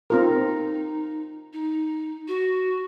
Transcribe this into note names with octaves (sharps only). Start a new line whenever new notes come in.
C4 D#4 F4 A#4
D#4
F#4